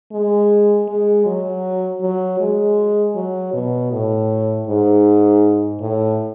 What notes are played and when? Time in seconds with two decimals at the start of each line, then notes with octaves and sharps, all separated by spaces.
0.12 G#3
0.88 G#3
1.26 F#3
2.01 F#3
2.40 G#3
3.16 F#3
3.53 B2
3.92 A2
4.67 G#2
5.80 A2